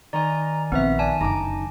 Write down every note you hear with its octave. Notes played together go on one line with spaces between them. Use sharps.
D#3 D5 G#5 A#5
A#1 F3 B3 C4 B4 E5
D5 G#5 A5
F#1 D3 D#4 A#5 D6